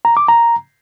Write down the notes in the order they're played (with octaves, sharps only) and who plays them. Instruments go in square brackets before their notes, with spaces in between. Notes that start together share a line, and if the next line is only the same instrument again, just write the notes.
[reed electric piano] A#5
D6
A#5